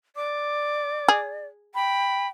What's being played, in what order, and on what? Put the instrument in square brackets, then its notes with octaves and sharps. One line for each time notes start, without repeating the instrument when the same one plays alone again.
[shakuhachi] D5 [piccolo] D6
[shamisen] G#4
[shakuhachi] G5 [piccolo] B5